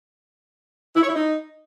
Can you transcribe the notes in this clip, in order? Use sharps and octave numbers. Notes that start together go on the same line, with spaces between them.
E4
C#5
E4
D#4